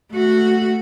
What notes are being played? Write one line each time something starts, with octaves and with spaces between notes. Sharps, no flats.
A3 F#4